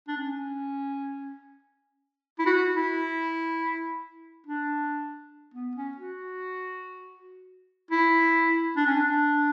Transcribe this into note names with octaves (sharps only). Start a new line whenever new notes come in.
D4
C#4
E4
F#4
E4
D4
B3
C#4
F#4
E4
D4
C#4
D4